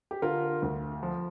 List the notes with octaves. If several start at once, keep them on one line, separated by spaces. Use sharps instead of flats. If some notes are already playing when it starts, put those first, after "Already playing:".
G4
D3 F4 A#4
D2
F3